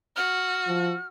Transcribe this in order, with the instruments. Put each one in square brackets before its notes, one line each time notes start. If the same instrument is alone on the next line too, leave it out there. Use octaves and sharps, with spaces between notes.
[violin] F#4 [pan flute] F6
[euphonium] F3